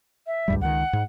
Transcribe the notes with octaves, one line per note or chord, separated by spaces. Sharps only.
E5
C#2 G2 G3
C#2 D#3 F#5
G#2